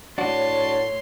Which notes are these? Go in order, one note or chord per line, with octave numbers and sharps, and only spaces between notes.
A2 D4 F#4 C#5 A5 C6